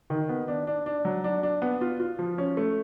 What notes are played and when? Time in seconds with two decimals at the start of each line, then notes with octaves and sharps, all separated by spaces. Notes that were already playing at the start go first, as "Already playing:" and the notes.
0.10 D#3
0.29 B3
0.48 D4
0.67 D4
0.86 D4
1.05 F#3
1.24 D4
1.43 D4
1.62 B3
1.81 F4
2.00 F4
2.19 F3
2.38 C#4
2.57 A3